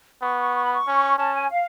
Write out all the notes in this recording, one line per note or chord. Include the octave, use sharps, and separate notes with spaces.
B3 C#6
C#6
C#6
B5
C#6
C#4
C#4 A5
G#5
F5